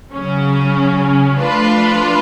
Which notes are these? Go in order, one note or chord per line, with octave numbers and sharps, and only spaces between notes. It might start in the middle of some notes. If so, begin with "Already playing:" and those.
C#3 F#3 C#4
F3 A3 D4 F4 B4